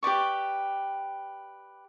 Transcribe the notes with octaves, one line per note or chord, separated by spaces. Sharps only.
G4 B4 D5 C#6